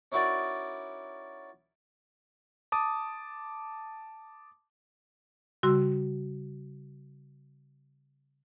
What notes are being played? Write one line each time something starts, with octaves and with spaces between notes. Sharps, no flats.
C#4 D#4 E4 F#4 A#4 D5
A5 D6 D#6
C#3 G3 F#4 C6 E6